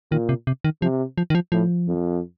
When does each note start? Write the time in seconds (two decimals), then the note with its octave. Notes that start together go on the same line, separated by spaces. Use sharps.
0.11 A#2 D#3
0.29 C3
0.47 C3
0.64 D#3
0.82 C3 F3
1.18 F3
1.30 D#3
1.35 F3
1.52 A2 F3
1.88 F2